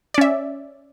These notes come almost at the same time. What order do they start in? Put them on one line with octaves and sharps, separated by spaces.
D5 C#4 E5